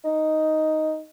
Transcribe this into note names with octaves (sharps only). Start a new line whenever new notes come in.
D#4